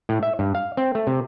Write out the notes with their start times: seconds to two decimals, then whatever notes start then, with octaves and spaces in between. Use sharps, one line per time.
0.09 A2
0.23 E5
0.39 G2
0.55 F5
0.77 C4
0.95 A3
1.07 C3